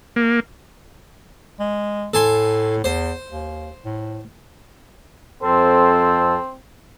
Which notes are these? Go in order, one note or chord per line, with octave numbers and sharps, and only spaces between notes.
A#3
G#3
A2 A4 G#5 C6
E2 C5
D#2
A2
F2 C4 A4 C5